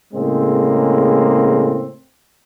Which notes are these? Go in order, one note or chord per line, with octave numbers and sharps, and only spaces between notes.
A2 C#3 G#3 A#3 C4